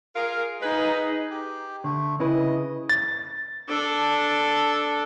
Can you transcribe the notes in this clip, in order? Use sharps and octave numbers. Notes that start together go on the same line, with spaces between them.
F4 G#4 A#4
D#4 G#4 B4
G4
D3 A3
C#3 E4 B4 D#5
A6
D4 A4